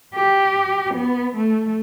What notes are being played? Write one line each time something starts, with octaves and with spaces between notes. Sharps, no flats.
G4
B3
A3